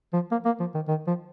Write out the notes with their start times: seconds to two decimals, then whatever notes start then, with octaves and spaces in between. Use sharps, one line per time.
0.13 F3
0.32 A#3
0.45 A#3
0.60 F3
0.74 D#3
0.88 D#3
1.07 F3